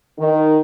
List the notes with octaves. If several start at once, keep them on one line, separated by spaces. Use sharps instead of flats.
D#3